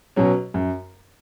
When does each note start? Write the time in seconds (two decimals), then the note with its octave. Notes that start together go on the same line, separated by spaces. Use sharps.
0.16 B2 F#3 C#4
0.54 F#2